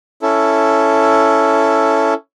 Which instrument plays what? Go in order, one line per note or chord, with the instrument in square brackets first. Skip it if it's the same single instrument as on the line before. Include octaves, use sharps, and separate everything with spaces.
[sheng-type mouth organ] C#4 E4 A4